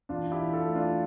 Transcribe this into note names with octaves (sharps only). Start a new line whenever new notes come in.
E2 D4 F4
E4 G4
E2
F4 A4
A3
D4 F4